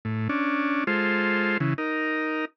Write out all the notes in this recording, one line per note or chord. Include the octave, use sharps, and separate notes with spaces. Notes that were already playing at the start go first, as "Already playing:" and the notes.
A2
C#4 D4
G#3 F4 A4 C5
C#3 E3
D#4 A#4